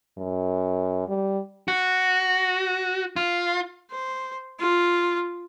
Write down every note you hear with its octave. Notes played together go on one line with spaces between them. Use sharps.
F#2
G3
F#4
F4
C5
F4